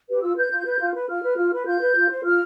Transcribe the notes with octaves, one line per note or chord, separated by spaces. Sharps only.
G4 B4
F4 E6
B4 G6
F4
B4
F4
B4
F4 F6
B4
F4
B4
F4 G6
B4
F4
C5
F4 F6